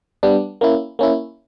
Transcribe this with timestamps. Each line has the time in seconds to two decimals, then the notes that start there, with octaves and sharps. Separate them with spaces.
0.23 G3 B3 D4
0.61 A#3 C#4 E4
0.99 A#3 C#4 E4